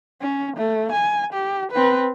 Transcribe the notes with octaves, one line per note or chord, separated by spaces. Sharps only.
C#4
A3
G#5
G4
C4 B4